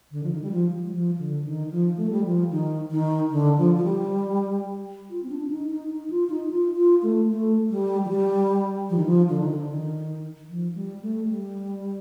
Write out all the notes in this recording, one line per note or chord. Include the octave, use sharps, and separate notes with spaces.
D3
F3
D#3
G3
F3
G3
F3
D3
D#3
F3
A3
G3
F3
D#3
D#3
D3
F3
F3
G3
F4
C4
D4
D4
D#4
D#4
D#4
F4
D#4
F4
F4
A3
A3
G3
F3
G3
F3
D#3
F3
D3
D#3
D3
D#3
F3
G3
A3
G3